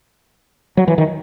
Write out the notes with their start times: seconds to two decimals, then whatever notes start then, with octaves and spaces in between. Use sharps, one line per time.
0.77 F#3
0.88 E3
0.98 D#3